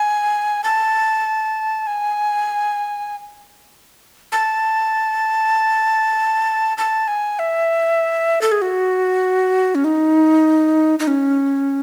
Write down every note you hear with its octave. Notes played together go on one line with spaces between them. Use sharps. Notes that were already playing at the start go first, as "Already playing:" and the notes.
Already playing: G#5
A5
G#5
A5
A5
G#5
E5
A4
G#4
F#4
C#4
D#4
D#4
C#4